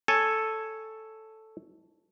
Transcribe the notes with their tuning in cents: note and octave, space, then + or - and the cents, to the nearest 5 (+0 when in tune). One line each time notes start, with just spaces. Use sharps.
A4 +0 C#5 +0 G#5 +0